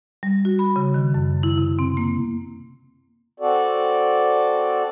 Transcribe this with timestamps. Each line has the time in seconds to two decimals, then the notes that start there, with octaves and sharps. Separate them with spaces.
0.23 G3
0.45 F#4
0.59 B5
0.76 C#3
0.94 D#3
1.14 F#2
1.43 E4
1.58 C3
1.79 C4
1.97 A#3
3.40 C4 F#4 A4 D5